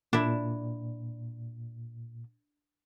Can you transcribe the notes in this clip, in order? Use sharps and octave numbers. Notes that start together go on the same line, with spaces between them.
A#2 D4 E4